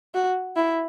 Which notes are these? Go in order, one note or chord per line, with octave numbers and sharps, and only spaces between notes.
F#4
E4